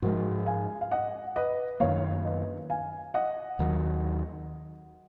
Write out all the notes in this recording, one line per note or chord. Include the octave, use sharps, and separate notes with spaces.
G#2 F3 G#3 F#4 A#4
F5 G#5
F5
D#5 F#5
B4 D#5
F#2 D#3 A#3 C#5 F5
B4 D#5
F5 G#5
D#5 F#5
D#2 D#3 F#3